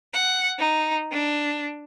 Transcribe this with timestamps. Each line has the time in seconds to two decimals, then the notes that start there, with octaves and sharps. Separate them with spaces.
0.14 F#5
0.59 D#4
1.12 D4